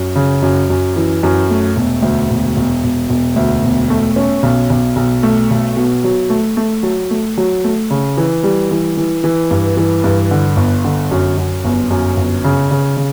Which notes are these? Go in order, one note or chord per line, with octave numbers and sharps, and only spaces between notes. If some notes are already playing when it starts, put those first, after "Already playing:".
Already playing: F#2
C#3
F#2
F#2
E3
F#2
A3
E1
D2
E1
E1
E1
E1
D2
E1
A3
C#4
B1
B1
B1
A3
B1
B2
F#3
A3
A3
F#3
A3
F#3
A3
C#3
E3
G3
E3
E3
E3
G2
E3
G2
D3
G1
D3
F#2
F#2
G1
F#2
G1
C#3
C#3
C#3